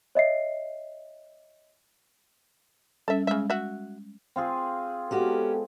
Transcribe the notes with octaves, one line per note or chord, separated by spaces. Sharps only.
C#5 D#5 E5 C7
G3 C#4 A4 E5
C#3 G#3 E5
F#4 E5
C4 F4 G#4
G#3 B3 C#4 F#4 G4 A4